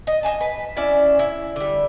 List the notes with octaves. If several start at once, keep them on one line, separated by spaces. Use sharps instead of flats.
D#5
D#5 F5 G#5 A5
B4
C#4 D4 E4 D5
E4
D3 G3